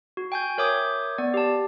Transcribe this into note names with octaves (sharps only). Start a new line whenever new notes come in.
F#4
G5 G#5 G6
A#4 C#5 E5 D6 D#6 G6
B3 D5
G4 A5